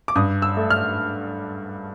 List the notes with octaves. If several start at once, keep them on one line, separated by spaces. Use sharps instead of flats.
D6
G2 D#6
E6
A3
F6